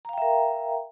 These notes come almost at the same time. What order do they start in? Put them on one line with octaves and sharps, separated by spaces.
A#5 F5 G5 E5 A#4